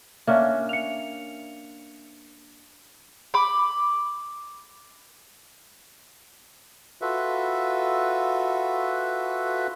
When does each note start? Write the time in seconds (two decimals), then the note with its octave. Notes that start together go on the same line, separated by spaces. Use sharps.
0.27 A#3 C#4 D4 E5
0.69 C#7 F7
3.34 B5 D6
7.02 F4 F#4 A4 B4 E5